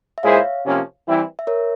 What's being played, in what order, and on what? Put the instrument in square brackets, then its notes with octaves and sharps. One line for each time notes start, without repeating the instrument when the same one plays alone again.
[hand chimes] E5
[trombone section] A#2 G#3 E4 G#4 C5 [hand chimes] C#5 F5
[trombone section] C3 F3 A#3 C#4
E3 G3 C4 E4
[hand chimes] E5
A#4 C#5